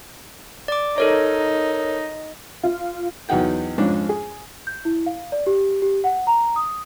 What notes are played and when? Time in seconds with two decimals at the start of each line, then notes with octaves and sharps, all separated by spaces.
0.68 D5 D6
0.98 D#4 A4 A#4 C#5
2.63 F4
3.29 E2 F#3 D#4 F#5 G5
3.78 F2 G#2 C#4 D4
4.09 G#4
4.67 G6
4.85 E4
5.06 F5
5.32 D5
5.47 G4
5.82 G4
6.04 F#5
6.27 A#5
6.56 D#6